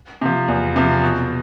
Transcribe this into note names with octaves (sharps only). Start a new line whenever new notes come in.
C3 F3
E2
C3 F3
B2